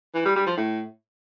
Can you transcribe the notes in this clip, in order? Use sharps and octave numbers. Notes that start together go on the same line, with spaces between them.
E3
G3
G3
F3
A2